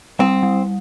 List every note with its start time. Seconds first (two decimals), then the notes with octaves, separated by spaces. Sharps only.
0.19 G3 C4
0.43 G3